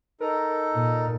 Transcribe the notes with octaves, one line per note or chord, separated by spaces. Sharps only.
D#4 A4 A#4
A#2